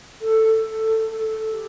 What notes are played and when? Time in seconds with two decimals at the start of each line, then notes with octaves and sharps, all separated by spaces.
0.21 A4
0.65 A4
1.09 A4
1.52 G4